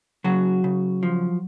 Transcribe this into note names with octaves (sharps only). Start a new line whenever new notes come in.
C#3 F#3 F#4
C#3
F3